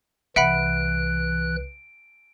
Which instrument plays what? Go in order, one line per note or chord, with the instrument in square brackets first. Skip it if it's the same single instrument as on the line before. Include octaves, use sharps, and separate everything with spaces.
[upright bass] C2 [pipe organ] E3 F#6 [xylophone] E5 F#5 B5 [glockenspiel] D7